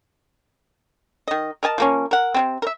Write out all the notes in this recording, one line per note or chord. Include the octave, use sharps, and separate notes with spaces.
D#3 D#5
A#4 D#5 G#5 A5
F3 A#3 C#4
A#4 F#5
C3 G#3 C4
A#4 E5